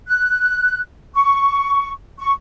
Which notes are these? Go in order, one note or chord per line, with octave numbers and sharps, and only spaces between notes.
F#6
C#6
C#6